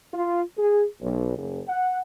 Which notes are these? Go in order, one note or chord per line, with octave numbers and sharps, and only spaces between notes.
F4
G#4
B1
F#1
F#5